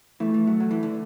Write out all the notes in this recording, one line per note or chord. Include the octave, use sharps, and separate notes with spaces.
E3 A3
E3
F#3
F#3
E3
D3